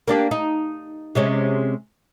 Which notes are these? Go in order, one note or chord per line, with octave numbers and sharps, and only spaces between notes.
A#3 D4 G4
D#4
C3 G#3 C#4